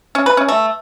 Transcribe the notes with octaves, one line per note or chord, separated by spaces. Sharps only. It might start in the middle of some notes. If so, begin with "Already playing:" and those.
C#4
B4
C#4
A3